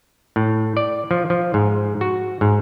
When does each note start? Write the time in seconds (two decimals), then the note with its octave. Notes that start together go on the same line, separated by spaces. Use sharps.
0.36 A2
0.77 D5
1.11 F3
1.30 F3
1.54 G#2
2.01 F#4
2.41 G#2